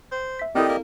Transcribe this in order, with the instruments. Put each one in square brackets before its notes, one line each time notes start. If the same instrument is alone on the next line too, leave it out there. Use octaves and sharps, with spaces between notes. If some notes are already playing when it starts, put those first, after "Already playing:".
[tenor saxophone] C5
[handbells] E5 B6
[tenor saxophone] D#3 [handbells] C4 E4 A4 [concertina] G4 D5 D#5
[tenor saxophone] A#3